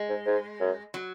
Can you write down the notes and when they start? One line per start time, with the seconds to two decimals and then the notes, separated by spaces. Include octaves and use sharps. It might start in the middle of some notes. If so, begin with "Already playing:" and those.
Already playing: G#3
0.09 G#2
0.26 G#2
0.60 F#2
0.94 F#3